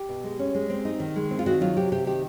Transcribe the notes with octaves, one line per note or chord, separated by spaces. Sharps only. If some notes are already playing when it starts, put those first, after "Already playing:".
Already playing: G4
B2
G#3
C#4
G#3
C4
D#4
D#3
G#3
C4
F4
D#3 F#4
F#3 F4
C3 G4
C3 G4
D#3 G4